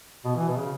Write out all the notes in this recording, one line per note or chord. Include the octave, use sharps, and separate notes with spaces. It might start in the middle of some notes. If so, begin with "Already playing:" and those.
B2
E3
B2
C#3